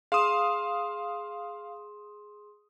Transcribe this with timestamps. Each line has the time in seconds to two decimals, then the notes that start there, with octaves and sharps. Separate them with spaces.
0.12 G#4 F5 C6 D#6 E7